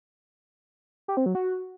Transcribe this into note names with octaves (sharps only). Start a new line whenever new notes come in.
G4
C4
F#3
F#4